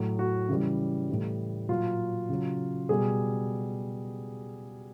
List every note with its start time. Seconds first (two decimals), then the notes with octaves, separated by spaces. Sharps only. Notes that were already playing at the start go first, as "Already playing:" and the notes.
Already playing: A2 F#3
0.19 F#4
0.49 C#3 E3 G3
1.09 A2 E3 G3
1.69 A#2 F#3 F4
2.29 C#3 F#3
2.89 B2 G3 G#4